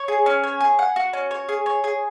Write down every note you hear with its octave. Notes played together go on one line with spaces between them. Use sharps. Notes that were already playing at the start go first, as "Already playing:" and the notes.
Already playing: C#5
G#4
C#4
C#5
G#4
F#5
F#4
C#4
C#5
G#4
C#5
G#4